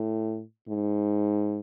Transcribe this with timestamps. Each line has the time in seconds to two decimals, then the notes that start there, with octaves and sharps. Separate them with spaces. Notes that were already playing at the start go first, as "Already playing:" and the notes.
Already playing: A2
0.69 G#2